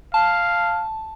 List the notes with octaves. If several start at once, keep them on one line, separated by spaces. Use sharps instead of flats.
F5 A5